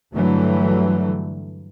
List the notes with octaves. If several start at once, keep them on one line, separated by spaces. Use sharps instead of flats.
G2 D3 E3 F#3 A3